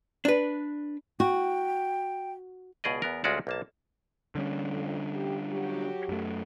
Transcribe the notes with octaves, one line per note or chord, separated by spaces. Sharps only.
D4 B4
F#4 G5
C#2 B2 G#4 D5 D#5
E2 B3 A#4
D2 G#3 C#4 F4 F#4 D5
B1 A#3 A5
D3 G3 C#4
F2
G4
F#3 F#4 G4
F#2 A3